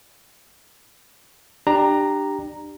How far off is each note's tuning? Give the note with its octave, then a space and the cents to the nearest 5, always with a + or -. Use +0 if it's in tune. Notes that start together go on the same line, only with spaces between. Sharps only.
D4 +25 G4 +0 A#5 +0